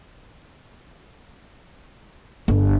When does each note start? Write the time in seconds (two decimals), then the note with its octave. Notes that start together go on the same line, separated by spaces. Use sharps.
2.48 G1